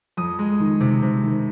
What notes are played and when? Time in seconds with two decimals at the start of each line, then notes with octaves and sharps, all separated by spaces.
0.17 F2 D#6
0.39 G#3
0.60 D#3
0.81 C3
1.02 C3
1.24 D#3